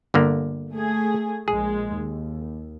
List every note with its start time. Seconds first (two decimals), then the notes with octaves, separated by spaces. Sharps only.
0.14 G1 D3 A#3
0.71 A3 G#4
1.48 A#1 G#3 G#4
1.92 D#2